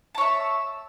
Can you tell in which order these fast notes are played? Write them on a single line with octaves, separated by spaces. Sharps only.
A5 C#5 E5